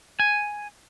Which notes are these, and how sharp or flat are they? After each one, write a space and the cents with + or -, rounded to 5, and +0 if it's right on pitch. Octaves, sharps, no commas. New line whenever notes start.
G#5 +0